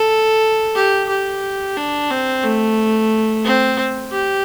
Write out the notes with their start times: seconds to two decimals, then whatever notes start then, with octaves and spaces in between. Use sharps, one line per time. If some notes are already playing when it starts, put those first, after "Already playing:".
Already playing: A4
0.75 G4
1.09 G4
1.77 D4
2.10 C4
2.43 A3
3.45 C4
4.12 G4